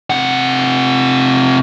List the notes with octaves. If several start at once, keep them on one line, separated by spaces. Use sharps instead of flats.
C3 F#5